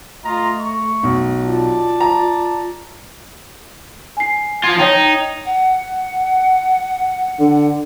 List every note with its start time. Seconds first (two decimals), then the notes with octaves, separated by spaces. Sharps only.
0.24 A3 F4 D#5 A#5
0.58 C#6
1.03 B1
1.44 F4 D5 A5
2.01 A#5
4.17 G#5 C7
4.64 F3 F4 G#6
4.79 D#4 C#5 G5 G#6
5.45 F#5
7.40 D3